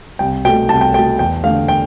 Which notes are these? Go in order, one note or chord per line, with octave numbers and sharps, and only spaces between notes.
C2 G5
B2 A3 G5
C2 A5
G5
B2 A3 G5
E2 G5
D3 A3 F5
G5